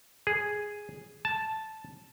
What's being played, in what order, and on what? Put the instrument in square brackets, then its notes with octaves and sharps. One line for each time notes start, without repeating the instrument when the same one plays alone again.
[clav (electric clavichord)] G#4
A5